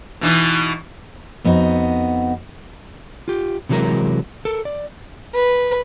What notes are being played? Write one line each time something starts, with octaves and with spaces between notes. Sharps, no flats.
B2 E3 D#4
F2 B3 D#4 F#4
F4 G4
C3 E3 F#3 G#3 A#4
A4 A#4
D5
B4